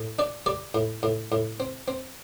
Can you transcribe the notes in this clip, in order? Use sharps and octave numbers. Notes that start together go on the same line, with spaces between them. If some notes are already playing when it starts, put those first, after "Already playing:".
Already playing: A2
D4 D5
G3 D5
A2
A2
A2
C4
C4